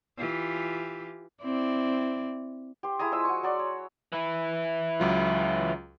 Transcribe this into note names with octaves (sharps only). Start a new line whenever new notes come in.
E3 F4 G4
C4 E4 D5
G4 C5
E4 G#4 A#5 D#6
F3 G#3 D#6 E6
F#4 C#6
F#3 D5 C6
C#5
E3 E4
C#2 F#3 F4